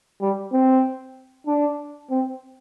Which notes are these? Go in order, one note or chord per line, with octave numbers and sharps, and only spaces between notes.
G3
C4
D4
C4